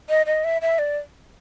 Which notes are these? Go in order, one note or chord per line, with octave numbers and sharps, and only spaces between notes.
D#5
D#5
E5
E5
D5